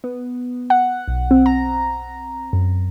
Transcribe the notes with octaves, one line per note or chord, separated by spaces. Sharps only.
B3
F#5
B1
C4
A#5
F#2